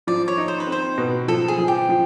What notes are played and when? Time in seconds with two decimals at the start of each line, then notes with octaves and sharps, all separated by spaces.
0.07 F3 D5
0.28 C#5
0.38 D#4
0.48 C5
0.60 B4
0.67 C4
0.72 C5
0.98 B2
1.28 F3 A4
1.48 G#4
1.59 F3
1.68 G4
1.89 F3